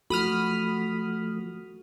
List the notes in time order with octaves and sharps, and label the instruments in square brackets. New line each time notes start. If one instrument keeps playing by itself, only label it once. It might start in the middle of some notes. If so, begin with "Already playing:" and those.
[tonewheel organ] F3 A3 [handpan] F#4 [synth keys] B5 D#6 F6